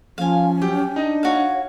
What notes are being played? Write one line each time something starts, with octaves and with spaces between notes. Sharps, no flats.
F3 C#4 F5 G#5
F#3 G4 G5
D4 D#4 D#5
F#4 C#5 F5